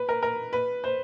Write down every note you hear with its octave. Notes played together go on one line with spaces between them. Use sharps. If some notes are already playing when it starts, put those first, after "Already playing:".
Already playing: B4
A#4
A#4
B4
C5